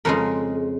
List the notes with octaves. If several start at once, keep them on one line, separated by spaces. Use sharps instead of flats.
F2 C#3 G#3 A#4